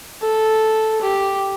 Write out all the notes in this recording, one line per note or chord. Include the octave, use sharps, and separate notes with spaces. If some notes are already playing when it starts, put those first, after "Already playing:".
A4
G4